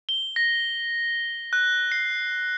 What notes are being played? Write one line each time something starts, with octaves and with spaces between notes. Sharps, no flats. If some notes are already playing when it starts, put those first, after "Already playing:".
G7
A#6
F#6
C7